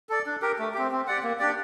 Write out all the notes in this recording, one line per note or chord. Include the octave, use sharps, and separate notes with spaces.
A4 D5
D4
G4 A#4
A3
C4 G4
C4
G4 D5 F#5
A#3
D4 G4 D5